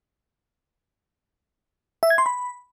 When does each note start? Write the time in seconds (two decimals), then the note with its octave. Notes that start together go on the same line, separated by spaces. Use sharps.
2.03 E5
2.10 G#6
2.18 C6
2.26 B5